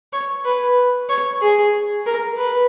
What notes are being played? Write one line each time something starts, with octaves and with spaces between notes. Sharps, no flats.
C#5
B4
C#5
G#4
A#4
B4